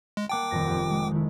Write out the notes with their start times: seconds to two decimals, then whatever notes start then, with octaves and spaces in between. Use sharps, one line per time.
0.17 G#3
0.29 A#3 F#5 G5 A5 D6
0.51 D#1 F2 A#6
0.66 F1 G4 F#5
0.90 G#3
1.11 D#3 E4